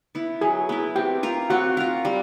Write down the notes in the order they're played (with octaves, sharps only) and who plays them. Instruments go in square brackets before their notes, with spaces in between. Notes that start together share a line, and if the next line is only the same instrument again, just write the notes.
[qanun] B3 E4
[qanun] F#3 [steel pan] G#4 G#5
[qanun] B3 E4
[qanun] C4 [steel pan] G4 G5
[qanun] F4 A#4
[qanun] C4 [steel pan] F#4 F#5
[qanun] F4 A#4
G3